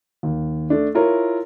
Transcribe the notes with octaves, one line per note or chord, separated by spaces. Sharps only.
D#2
A3 D4
E4 F4 A#4 C#5